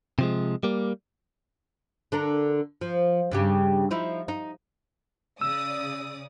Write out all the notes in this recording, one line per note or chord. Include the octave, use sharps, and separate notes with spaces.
C3 F3 G#3
G3 A#3
D3 D4 A#4
F3
G2 C#3 G4
F3 D#4 E4
D#4
C#3 D5 D#6 E6